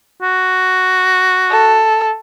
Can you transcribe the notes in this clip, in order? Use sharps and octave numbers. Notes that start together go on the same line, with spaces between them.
F#4
A4